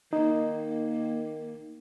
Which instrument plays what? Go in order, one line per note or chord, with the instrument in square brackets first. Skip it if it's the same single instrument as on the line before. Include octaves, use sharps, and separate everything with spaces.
[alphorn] D#3 [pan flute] A#3 [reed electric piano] D#4